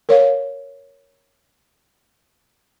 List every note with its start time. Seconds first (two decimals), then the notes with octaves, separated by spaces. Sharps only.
0.09 A#4 C#5 F5